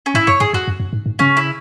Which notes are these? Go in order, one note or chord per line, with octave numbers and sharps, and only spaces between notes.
C#4
G#2 E4
F#2 C#5
G#2 G#4
F#2 F#4
F#2
F#2
G#2
G#2
C#3 C#4
E4